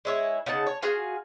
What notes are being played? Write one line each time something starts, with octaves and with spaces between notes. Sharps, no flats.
G#3 E4 C#5
C#3 D#4 F#5 A5
C#5
F4 F#4 G#4 F5